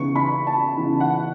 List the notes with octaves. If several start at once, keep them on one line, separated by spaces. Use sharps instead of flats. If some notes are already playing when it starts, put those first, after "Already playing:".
Already playing: C#3 E3 B3 D#4 C#6
B5
A5
C#3 E3 B3 D#4
F#5